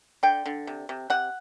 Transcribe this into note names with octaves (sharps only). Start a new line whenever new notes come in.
D3 G5
D3
C3
C3
C3 F#5